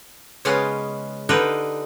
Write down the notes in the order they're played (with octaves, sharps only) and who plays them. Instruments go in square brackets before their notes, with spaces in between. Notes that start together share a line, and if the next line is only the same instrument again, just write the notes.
[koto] C#3 G#3 B3 C#4 F4 F5
D3 D#4 F4 G4 B4